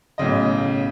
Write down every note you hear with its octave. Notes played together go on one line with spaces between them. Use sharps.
B1 A2 C#3 D#5